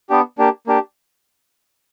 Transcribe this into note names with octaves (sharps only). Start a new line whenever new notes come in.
B3 D4 G4
A#3 D4 G4
A#3 D4 G4